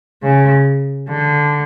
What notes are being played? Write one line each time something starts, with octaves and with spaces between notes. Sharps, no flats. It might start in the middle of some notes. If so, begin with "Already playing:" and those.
C#3
D3